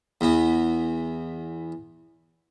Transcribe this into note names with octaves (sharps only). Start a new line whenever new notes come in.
E2 B3